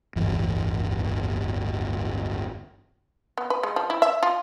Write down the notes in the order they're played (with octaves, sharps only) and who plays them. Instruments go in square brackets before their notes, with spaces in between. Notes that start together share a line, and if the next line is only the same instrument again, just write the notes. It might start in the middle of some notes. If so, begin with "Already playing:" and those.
[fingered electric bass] D1 G1 E2 E3
[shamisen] B3
B4
G#3
F3
E4
E5
F4